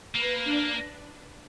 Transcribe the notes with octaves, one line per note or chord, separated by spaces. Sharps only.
A#3 B4
D4